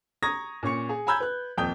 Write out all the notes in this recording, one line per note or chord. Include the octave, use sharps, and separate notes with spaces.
A#5 C#6 D#6 G#6 A#6
A#2 C#4 C#6 C#7
G#4
G#5 A#5 B5 E6 G6 G#6
B4 F#6
D#1 F2 G5 D#6 G6